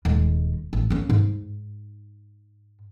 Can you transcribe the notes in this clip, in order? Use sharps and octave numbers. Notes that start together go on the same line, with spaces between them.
D#1 G#3
A1
A#3 C#4
G#2